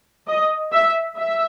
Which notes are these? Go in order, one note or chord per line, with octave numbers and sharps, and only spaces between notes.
D#5
E5
E5